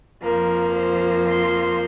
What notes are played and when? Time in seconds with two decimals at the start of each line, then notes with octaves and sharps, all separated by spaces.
0.22 F2 F3 A#3 A#4
0.74 C5
1.28 C6